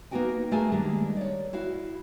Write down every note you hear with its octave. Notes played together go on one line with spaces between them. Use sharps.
A#3 B3 D#4 F#4 G5 G#5
A3 A#3 F#4 G#4 A4 G#5
D#3 G3 G#3 A#3 D4
C#5 D5
E4 F#4 F5